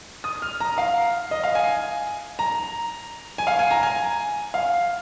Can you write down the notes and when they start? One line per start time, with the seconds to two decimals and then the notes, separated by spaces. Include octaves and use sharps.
0.24 D#6
0.42 F6
0.60 A#5
0.78 F5
1.31 D#5
1.44 F5
1.55 G#5
2.39 A#5
3.38 G#5
3.47 F5
3.59 G#5
3.71 A#5
3.83 G#5
4.54 F5